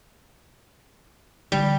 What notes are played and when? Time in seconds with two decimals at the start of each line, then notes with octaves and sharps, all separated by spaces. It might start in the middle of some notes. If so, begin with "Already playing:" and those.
1.52 D3 G3 B3